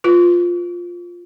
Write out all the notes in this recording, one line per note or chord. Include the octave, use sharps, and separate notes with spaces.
F4 B4